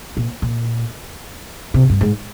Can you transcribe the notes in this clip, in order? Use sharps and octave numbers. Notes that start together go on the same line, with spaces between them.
A#2
A#2
C3
G2
G#2